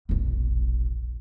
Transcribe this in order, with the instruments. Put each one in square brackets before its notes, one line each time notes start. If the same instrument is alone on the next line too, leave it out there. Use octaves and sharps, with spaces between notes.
[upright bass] E1 A#1